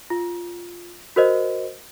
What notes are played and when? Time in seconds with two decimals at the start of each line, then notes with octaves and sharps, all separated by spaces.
0.10 F4
1.16 F#4 A#4 C5 D#5